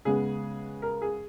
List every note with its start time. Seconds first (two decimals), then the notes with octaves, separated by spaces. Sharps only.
0.05 C#3 G#3 B3 G#4
0.82 A#4
1.02 G#4